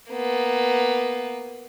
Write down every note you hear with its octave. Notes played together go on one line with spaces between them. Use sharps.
A#3 B3